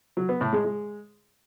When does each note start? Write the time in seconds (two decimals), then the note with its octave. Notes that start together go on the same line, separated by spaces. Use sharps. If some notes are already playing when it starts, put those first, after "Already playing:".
0.17 F#3
0.29 B3
0.41 A2
0.53 G#3
0.65 G#3